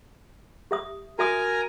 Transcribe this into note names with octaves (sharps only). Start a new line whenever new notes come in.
G4 E5 D#6
F#4 A#4 E5 G#5 A#5 D#6